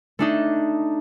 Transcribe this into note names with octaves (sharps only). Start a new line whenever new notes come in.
A3 D4 D#4